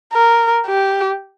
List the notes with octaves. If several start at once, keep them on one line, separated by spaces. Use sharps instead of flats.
A#4
G4